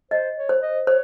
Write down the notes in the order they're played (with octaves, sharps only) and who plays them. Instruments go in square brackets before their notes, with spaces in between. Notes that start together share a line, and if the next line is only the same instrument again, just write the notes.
[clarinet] C5 [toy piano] D#5
[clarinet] C#5
[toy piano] C5
[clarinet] D#5
[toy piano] C5 [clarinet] C#5